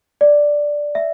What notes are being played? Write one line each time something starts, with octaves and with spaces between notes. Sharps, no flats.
D5
E5